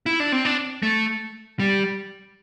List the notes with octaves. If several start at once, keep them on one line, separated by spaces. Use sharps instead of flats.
E4
D4
C4
D4
A3
G3